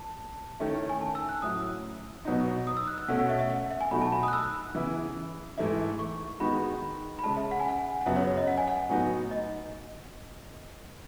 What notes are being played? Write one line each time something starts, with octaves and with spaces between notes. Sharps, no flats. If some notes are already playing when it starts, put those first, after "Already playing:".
Already playing: A5
D#3 A3 C#4 E4
G#5
A5
E6
F#6
A2 F#3 C#4 E4 D#6
B2 F#3 B3 D#4
D#6
E6
F#6
E6
B2 A3 C#4 F#5
F#5
E5
E5
F#5
E5
G#5
B2 F#3 A3 D#4 F#4 B5
A5
B5
D#6
F#6
E6
C#3 E3 B3 E4
G#2 E3 A3 E4
C#6
D#3 G#3 B3 D#4 F#4 B5
B5
C#3 G#3 C#4 A5
E5
F#5
G#5
F#5
F#5
F#2 C#3 F#3 B3 E5
C#5
C#5
D#5
F#5
G#5
F#5
A2 F#3 B3 D#4 F#4
D#5